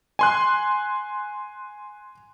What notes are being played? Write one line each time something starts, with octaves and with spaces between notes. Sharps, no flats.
G#5 C6 F#6